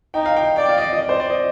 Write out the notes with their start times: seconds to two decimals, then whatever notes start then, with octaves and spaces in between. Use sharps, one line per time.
0.14 D#4 G5
0.26 F5
0.37 G5
0.56 D5 G5
0.69 F5
0.78 D#5
0.93 D#5
0.99 D5
1.09 C5
1.20 D5
1.30 D#5